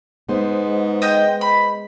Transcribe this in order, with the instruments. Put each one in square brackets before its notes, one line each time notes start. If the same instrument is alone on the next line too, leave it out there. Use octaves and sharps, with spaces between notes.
[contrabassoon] G#2 [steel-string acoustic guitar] B3 C5
[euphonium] G#3
[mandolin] D#5 G5 G6
B5